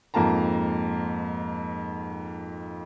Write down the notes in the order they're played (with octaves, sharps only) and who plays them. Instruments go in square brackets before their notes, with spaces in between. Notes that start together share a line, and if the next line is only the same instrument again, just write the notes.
[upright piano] F2 G#2 A#3 F4 A5 A#5